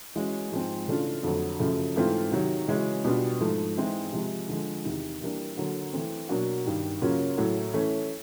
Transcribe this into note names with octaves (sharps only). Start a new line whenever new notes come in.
E3 G#3 C#4 F#4
G#2 F3 G#3 C4
C#3 E3 A3 D4 F4
F2 D3 F#3 A3
F#2 C#3 F3 A3
G#2 E3 A3 C4 F4
C3 D#3 F#3
C#3 E3 G#3 C#4 F#4
B2 G3 B3 D4 F4
G#2 F3 A3
G#2 E3 G#3 C4 E4
C3 F3 G#3
D3 F3 G#3
E2 C3 D#3
E3 G3 A#3 D4
D3 F#3 A#3
E3 A3 C4
B2 F#3 A#3 D4 F#4
G2 D#3 G3
C#3 F#3 A#3 C#4 F4
A2 F#3 A3
E3 A3 C#4